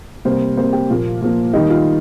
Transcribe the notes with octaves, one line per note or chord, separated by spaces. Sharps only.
C3 G3 A#3 C5
C3 G3 A#3 C5
G4
A#2 F3 A#3 F4
A#2 F3 A#3
D#3 G3 A#3 D#4
F4